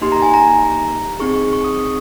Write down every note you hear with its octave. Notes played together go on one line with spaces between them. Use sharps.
A#3 D#4 G4 C6
A#5
G#5
A#5
C4 D#4 G#4 C#6
C#6
C#6
D#6
C#6